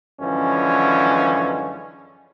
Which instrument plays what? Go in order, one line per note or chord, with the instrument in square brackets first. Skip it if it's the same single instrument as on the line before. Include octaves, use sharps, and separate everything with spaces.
[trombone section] F#2 D3 E3 F3 G#3 C#4